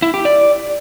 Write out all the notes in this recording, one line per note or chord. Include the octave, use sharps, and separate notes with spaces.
E4
G4
D5